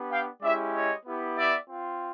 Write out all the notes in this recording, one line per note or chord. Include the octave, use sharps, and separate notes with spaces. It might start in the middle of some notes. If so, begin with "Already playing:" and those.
Already playing: B3 D4 G4
F5 G5
G#3 C#4 E4 G4 D5 E5
C#5 D#5
B3 E4 G4
D5 E5
C4 F4